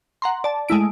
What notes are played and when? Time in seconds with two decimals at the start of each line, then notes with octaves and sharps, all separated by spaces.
0.22 F#5 A#5 C6
0.44 D5 A5
0.69 G#3 A3 E4 D7